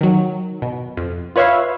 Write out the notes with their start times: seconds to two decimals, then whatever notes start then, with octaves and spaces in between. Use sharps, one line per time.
0.01 D#3 F#3
0.62 B2
0.97 F2
1.36 F4 B4 C#5 E5 F5